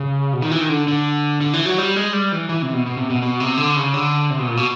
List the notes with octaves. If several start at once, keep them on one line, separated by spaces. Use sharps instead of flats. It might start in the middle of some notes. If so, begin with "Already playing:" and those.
Already playing: C#3
B2
D#3
E3
D#3
D3
D3
D3
E3
F#3
G3
G#3
G3
E3
E3
C3
B2
B2
C3
B2
B2
C3
D3
C#3
D3
C3
B2
A#2
B2